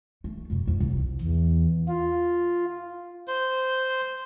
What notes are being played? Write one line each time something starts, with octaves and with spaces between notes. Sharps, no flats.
A3
F2 B2
F2
C2
E2
F4
C5